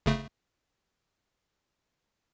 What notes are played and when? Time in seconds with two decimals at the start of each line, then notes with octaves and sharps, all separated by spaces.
0.06 G1 C#3 A3